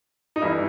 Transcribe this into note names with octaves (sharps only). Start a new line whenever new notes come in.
D#4
G1 G2 E3 E4